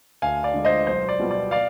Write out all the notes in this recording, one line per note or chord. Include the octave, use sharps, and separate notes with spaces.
D2 F5 G#5
D5 F5
D3 G#3
C5 D#5
B1 C5
D5
B2 G3 B3 F4
D5
D5 F5